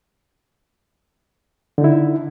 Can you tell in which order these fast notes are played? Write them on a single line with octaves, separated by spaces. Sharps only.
D3 D#4 E4